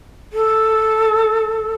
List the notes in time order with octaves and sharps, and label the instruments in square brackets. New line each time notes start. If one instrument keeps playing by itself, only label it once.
[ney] A4